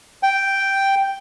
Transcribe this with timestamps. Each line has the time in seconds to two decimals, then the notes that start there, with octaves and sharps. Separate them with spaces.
0.23 G5